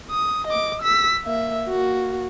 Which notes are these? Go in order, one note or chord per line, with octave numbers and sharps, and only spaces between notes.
D#6
D#5 D6
E6 B6
A#3 E5
A#3 F#4